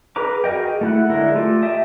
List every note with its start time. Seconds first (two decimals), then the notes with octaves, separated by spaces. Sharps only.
0.16 G#4 A#4 B4 A#5 D6
0.44 F#4 G#4 A#4 D#5 G5
0.81 A3 E4 F#5
1.10 D3 G#3 E4 A#4
1.35 A3 F4 G4 A4
1.62 D#5 E5 G5 A5 D#6